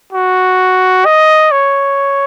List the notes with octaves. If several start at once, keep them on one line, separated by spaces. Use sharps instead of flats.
F#4
D#5
C#5